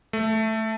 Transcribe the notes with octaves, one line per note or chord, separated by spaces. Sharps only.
A3